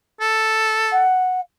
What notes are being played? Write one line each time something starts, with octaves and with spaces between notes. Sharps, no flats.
A4
F#5